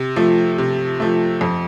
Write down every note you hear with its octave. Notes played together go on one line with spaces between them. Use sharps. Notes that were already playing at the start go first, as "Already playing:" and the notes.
Already playing: C3
F3 A3
C3
F3 A3
F2